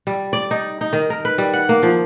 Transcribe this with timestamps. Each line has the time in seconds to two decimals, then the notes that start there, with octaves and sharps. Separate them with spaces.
0.07 G3
0.33 D5
0.51 D#4
0.81 D#4
0.93 D#3
1.10 A#4
1.25 B4
1.38 G3
1.53 F#5
1.69 A#3
1.83 F3